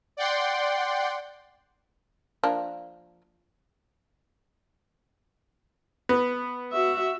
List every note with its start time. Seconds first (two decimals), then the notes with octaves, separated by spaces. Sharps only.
0.17 D5 F#5 G5 C6
2.44 F3 A#3 D4
6.09 B3
6.72 F#4 E5